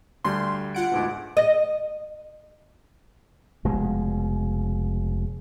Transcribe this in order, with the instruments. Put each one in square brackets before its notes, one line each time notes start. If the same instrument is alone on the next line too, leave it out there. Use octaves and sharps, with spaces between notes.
[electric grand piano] D2 D3 G3 [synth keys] C6
[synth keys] F4 F#5 D7
[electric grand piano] D2 G#2 B2
[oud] D#5
[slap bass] F1 B2 G#3